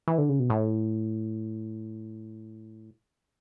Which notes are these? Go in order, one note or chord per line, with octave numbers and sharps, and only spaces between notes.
E3
D3
C#3
B2
A2